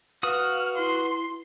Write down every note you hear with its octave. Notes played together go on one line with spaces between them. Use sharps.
F#4 B4 F5 D#6 F6
E4 C6